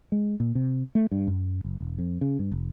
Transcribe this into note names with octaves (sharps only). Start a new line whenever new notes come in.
G#3
A#2
C3
A3
G2
F#2
F#1
E1
F2
C#3
G2
F1